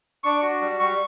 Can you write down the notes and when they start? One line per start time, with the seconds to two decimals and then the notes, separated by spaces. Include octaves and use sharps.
0.24 D4 C#6
0.42 F#4
0.61 G3
0.80 G3 C#6